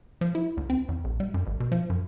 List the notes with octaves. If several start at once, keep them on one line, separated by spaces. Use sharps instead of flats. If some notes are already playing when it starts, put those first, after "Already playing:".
F3
E4
D2
C4
E2
A#1
G3
F#2
G#1
B2
F3
F#2